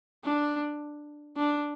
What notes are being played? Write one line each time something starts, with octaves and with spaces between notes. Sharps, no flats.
D4
D4